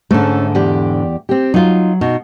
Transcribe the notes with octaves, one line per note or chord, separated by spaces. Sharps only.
G#2 D3 A3 C#4
E2 G4 D5
C4 G4
F#3 D#4 F4
B2 D#4